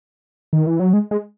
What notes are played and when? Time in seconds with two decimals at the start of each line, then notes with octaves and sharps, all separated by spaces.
0.53 D#3
0.67 E3
0.80 F#3
0.93 G#3
1.11 G#3